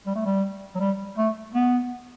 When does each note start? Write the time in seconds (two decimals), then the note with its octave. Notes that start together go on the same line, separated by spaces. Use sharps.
0.07 G3
0.16 A3
0.26 G3
0.75 F#3
0.80 G3
1.18 A3
1.54 B3